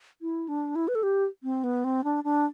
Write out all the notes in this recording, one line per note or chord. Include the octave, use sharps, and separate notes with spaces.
E4
D4
E4
B4
A4
G4
C4
B3
C4
D4
D4